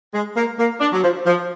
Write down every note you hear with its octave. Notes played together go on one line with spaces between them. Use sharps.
G#3
A#3
A#3
D4
F#3
F3
F3